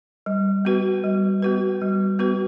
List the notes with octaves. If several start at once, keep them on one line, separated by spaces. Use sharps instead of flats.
G3
B3 F#4 B4
G3
B3 F#4 B4
G3
B3 F#4 B4